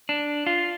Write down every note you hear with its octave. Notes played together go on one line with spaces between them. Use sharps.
D4
F4